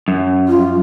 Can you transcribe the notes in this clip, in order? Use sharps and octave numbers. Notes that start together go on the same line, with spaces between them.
F#2
F4